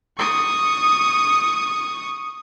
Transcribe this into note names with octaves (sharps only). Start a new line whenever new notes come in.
C#6 D#6